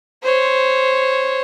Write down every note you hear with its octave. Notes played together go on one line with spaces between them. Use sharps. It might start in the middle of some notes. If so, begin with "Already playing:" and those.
C5 C#5